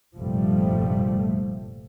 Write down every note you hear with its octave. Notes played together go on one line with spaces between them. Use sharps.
F1 A#1 G2 F3 G3 A3